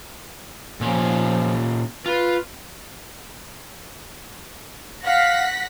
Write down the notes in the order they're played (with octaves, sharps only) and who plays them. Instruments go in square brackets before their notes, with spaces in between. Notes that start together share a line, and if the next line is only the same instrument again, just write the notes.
[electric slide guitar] A#2 C#4 [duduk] F3
[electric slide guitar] F4 [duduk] B4
[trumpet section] F5 [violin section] F#5 A#6 B6